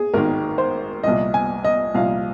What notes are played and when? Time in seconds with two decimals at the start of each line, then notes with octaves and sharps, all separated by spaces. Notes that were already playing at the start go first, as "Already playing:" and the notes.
Already playing: G#4
0.14 G#1 G#2 D#3 A#4
0.58 C5
1.03 C2 A#2 F3 D#5
1.34 G#5
1.64 D#5
1.94 C2 A#2 F3 F5